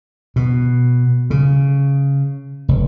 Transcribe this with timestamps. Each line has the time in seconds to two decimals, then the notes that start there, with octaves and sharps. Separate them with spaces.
0.36 B2
1.30 C#3
2.68 F1